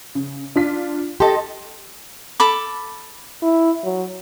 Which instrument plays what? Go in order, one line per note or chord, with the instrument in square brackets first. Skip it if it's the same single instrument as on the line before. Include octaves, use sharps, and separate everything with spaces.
[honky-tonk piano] C#3
D4 F4 B6
[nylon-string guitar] G4 A4 [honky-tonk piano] D#5 A5 C6
[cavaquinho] A4 B5 D6
[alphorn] E4
F#3